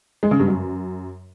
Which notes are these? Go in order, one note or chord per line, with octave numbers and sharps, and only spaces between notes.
G#3
C#3
G2
F#2